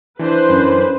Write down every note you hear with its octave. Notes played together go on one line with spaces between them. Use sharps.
E3 D4 B4 C5
F#2